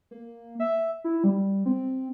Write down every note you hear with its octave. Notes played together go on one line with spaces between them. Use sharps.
A#3
E5
E4
G3
C4